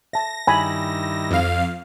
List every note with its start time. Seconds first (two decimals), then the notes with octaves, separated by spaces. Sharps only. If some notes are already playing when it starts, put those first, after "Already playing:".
0.13 E5 A5 A#6
0.47 G2 D#3 E4 G#5 B5
1.31 F2 F5